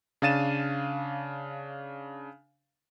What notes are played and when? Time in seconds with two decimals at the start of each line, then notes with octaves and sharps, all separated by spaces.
0.22 C#3 D4 F5 A6 D#7 E7